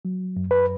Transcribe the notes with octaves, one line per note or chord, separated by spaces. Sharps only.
F#3
F#2
B4